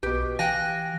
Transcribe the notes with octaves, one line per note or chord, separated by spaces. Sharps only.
B1 B2 G4 B4
E3 F5 G5 G#5 F#6 A#6